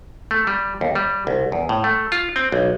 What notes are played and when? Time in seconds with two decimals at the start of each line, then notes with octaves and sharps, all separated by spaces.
0.31 A3
0.47 G3
0.81 D#2
0.95 G3
1.27 C2
1.52 E2
1.69 A2
1.84 A3
2.12 F4
2.36 C4
2.52 B1